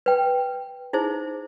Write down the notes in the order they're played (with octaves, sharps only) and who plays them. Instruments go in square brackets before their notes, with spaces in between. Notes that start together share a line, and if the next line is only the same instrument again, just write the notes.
[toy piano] B4 G5
D#4 E4 G#4 C5